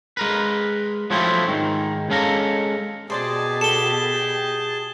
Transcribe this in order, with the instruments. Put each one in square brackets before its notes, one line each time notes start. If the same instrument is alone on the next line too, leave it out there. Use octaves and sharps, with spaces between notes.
[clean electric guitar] G#3 A#4 B4
F3 F#3 A3 C4 E4 F4
G#2 D#3
G#3 C#4 A4 F5 A#5
[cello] B2 G4 [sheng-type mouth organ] G#4 A5 [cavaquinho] C5 D5 D#5
[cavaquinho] A4 [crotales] E7 G7
[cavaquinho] G5